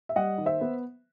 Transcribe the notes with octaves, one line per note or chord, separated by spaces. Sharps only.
E5
G3 D#5 F#5
D#3
C5 E5
B3